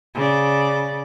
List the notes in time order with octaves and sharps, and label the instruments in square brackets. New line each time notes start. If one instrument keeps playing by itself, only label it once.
[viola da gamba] C#3 D5